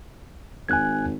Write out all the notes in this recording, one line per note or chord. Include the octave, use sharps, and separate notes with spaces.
G#1 G#5 F#6 G#6